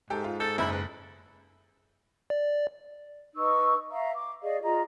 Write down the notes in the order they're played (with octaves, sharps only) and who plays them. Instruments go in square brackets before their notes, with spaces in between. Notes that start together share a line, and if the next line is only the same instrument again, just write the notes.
[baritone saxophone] G#2 [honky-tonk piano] G4 A4 G5
[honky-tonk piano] F4
[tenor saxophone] A4 [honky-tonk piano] G6 A6
[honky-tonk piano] F#1 B5 F#7 [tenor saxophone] E4
[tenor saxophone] B4
[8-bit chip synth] D5
[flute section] D#4 B4 C#6 E6
E5 F5 A#5
D6
G#4 D5 D#5 F5
F4 G#4 D#5 A#5